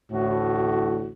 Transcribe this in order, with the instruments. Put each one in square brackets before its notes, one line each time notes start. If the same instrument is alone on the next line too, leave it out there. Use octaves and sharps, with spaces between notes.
[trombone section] A1 D2 A2 [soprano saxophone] F#4